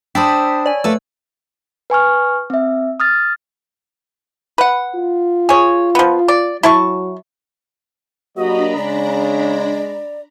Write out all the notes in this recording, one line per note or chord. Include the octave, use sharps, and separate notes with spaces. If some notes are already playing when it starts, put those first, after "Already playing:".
D4 C5 G5 A5 B5 D#6 E6 B6
C#5 D5 G#5
A3 A#3 A4 B4 E6
B4 G#5 C#6 F6
C4 E5
D#6 F6 A6
B4 F#5
F4
G#4 C#5
F3 B3
D5
F#3 E4 A5 C#6
F#3 A#3 D4 F#4 G4 D#5 A#5 B5
C#3 G#3 D5